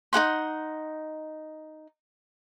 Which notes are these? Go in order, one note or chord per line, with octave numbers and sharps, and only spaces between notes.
D#4 G#4 F#5 C6